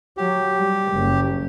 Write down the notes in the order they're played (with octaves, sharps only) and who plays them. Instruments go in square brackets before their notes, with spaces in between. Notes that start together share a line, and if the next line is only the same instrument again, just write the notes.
[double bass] F#3 [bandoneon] G4
[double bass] G3
F#1